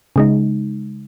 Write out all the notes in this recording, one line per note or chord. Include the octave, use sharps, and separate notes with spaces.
C#3 G#3 D#4